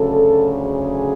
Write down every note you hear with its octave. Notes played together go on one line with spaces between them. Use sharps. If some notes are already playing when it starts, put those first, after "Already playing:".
Already playing: D2 C#3 F#3 A4
G#4